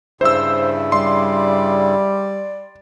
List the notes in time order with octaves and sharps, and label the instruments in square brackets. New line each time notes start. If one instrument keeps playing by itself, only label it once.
[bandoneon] G2 C#3 E4 [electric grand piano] C5 E6
[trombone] G3 [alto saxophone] D5 [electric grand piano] C6